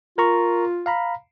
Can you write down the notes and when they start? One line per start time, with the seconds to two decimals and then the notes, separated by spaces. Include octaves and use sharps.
0.18 F4 A#4 A#5 C#6
0.86 F5 A#5 B5